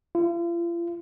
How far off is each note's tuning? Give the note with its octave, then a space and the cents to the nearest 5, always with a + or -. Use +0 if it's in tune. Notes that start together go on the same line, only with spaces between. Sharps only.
F4 -40